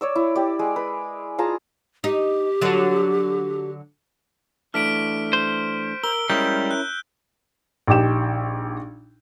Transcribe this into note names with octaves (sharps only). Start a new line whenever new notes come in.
C#5 D5 E6
E4
G4 D5
G#3
B4
F4 G#4 A5 A#5
D#4 G4
D3 F#3
E3 A3 D4 F6 B6 D7
C5
A#4 E6 G7
G3 G#3 C#4 E4 A#4 G6
F#6
A#1 D#4 G4 G5 E7